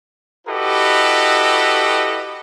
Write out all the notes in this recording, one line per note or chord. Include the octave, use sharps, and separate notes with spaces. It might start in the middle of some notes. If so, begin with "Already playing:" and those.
E4 F#4 G4 A4 B4 D#5